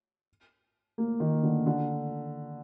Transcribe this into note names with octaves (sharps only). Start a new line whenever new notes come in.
A#3
D#3
D3
D3